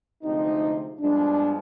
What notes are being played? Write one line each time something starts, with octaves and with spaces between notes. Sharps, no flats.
D2 C3 F3 G#3 C4 D#4
G2 F3 G#3 B3 D4